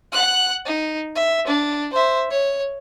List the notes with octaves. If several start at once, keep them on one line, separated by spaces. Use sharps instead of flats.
F#5 F#6
D#4
E5
D4
C5 E5
C#5